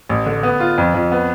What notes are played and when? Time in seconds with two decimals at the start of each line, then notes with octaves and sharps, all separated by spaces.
0.09 A1
0.26 D3
0.43 B3
0.60 F4
0.78 F2
0.94 F2
1.11 B3